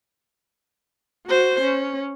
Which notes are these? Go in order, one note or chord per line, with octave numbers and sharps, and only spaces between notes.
F#4 C5
C#4